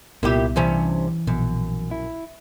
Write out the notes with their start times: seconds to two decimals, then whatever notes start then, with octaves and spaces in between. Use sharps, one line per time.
0.23 C2 A#2 B3 E4 G4
0.56 G2 C3 E3 C#4
1.27 A#1 F#2 B2
1.91 E4